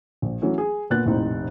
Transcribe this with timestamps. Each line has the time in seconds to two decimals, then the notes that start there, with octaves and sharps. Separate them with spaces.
0.22 A#1
0.42 E3 F#3 A3 C#4
0.58 G#4
0.90 A#2 B3 F#6 A6
1.05 F1 A#1 A2 C4 D#4